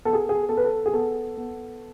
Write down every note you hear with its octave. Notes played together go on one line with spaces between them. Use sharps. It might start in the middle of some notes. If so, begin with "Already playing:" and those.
B3 A4
G#4
G#4
B3 A4
B4
A4
G#4
B3 A4
B3